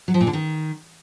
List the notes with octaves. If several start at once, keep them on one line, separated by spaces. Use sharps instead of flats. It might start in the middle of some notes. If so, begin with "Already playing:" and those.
F#3
F3
A#2
D3
D#3